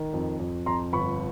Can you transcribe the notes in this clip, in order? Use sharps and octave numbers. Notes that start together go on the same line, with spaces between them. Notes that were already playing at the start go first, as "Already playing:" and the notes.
Already playing: D#3
F2
F2
F2 A#5 C6
G1 B5 C#6